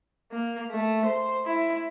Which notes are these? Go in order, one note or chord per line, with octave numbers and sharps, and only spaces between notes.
A#3
A3
C5
E4